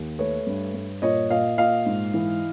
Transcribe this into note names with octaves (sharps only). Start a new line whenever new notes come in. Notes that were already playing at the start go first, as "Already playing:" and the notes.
Already playing: D#2
A3 B4 C#5
G2
G2
A#2 C#5 D#5
A#2 D#5 F5
A#2 D#5 F5
G#2
E3